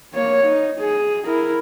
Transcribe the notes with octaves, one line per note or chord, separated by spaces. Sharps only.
A#3 C#5
D#4
G#4
E4 A#4